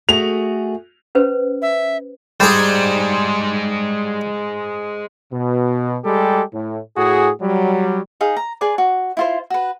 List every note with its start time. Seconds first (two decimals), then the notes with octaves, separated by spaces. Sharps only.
0.09 A3 F#4 G#4 F7
1.15 C#4 B4 C5
1.62 E5
2.40 G3 G#3 G#4 C5
5.32 B2
6.05 G3 G#3 G4 A4
6.52 A2
6.97 A2 F#4 G#4
7.41 F#3 G3
8.21 D#4 G#4 F5
8.37 A#5
8.61 G#4 B4 D5 D6
8.78 F#4
9.17 E4 F4 C5
9.50 F#4 B4